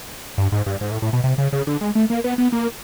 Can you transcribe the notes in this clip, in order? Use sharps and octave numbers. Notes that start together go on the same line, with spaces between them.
G2
G#2
G2
G#2
A2
A2
B2
C3
C#3
C#3
D3
G#3
A3
A#3
B3
B3
A#3